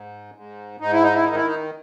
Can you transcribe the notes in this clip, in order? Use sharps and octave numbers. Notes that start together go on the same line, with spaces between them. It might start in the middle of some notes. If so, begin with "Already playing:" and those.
Already playing: G#2
G#2
G#2 D#4
E4
D#4
E4
D#3 D#4
E4
D#4